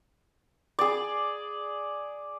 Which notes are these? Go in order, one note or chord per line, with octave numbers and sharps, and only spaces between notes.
G#4 D5